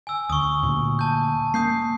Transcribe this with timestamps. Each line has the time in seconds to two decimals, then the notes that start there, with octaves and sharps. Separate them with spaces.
0.07 G#5 E6
0.30 D2 C#6 D#6
0.63 D2 A#2
0.99 A5 G6
1.54 A#3 D#6 G6 C7